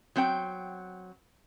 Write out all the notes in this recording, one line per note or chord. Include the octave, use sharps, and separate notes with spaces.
F#3 C4 F#5 G5